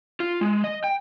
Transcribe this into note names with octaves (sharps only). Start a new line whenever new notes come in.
F4
G#3
D#5
G5